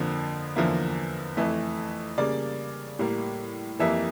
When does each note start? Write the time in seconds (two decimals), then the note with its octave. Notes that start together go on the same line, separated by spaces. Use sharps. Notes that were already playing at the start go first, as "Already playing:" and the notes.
Already playing: F2 D3 F3 A#3
0.56 E2 D3 F3 A#3 E4
1.37 F2 E3 A3
2.17 C#3 G3 A#3 D5
2.99 A2 G3 A#3
3.79 F2 E3 G3 A#3 E5